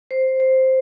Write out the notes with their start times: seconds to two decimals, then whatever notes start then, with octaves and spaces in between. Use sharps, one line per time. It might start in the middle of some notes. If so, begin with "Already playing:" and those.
0.11 C5
0.40 C5